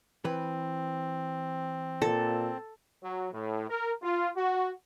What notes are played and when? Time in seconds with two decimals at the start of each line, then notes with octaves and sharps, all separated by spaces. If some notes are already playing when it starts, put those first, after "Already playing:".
0.25 E3 C4 B4
2.02 A#2 A4
3.04 F#3
3.33 A2
3.69 A#4
4.03 F4
4.36 F#4